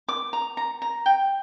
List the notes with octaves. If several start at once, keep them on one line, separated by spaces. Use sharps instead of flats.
D6
A#5
A#5
A#5
G5